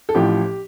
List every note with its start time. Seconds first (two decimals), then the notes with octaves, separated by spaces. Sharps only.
0.09 A4
0.14 A1 A2 F3 G4